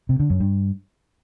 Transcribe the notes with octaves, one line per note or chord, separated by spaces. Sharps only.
C3
D3
F#2
G2